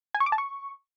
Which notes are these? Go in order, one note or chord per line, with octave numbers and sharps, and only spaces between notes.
G#5
C#6
D6
A5
C#6